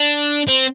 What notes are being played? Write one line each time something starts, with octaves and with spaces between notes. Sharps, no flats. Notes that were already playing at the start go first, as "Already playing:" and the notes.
Already playing: D4
C4